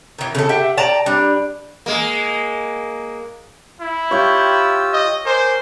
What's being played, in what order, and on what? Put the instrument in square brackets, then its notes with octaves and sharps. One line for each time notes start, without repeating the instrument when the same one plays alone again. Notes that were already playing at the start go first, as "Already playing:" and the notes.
[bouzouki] D#3 E3
C#3 A4
G4 E5 F#5
D5 G5 A5 A#5
G3 D4
[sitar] G#3 A#3
[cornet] E4
[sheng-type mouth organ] F4 G4 E6 [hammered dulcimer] C#5 G5
[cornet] D#5
[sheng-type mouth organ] A#4 G#5 D6 [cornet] C5